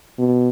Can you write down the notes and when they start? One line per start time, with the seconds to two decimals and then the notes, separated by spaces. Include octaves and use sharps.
0.19 B2